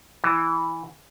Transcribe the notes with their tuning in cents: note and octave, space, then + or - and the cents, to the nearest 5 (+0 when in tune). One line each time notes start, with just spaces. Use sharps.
E3 -5